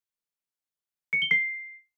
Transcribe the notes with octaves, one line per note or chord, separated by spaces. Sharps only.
C#7
G7
C7